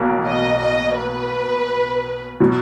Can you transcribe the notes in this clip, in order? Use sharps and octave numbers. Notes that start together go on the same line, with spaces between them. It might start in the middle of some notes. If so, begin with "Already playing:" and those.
Already playing: B1 B2 A#3
D#5
D#5
B4
B2 F#3